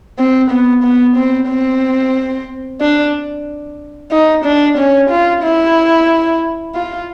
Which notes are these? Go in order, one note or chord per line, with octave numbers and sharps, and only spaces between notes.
C4
B3
B3
C4
C4
D4
D#4
D4
C#4
F4
E4
F4